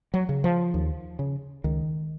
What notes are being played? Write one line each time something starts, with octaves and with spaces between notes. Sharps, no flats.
F#3
C#3
F3
D#2
C#3
C#2 D#3